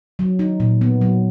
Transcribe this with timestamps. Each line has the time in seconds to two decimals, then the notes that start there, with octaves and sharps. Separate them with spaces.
0.19 F#3
0.39 D#4
0.60 A#2
0.81 B3
1.01 F#3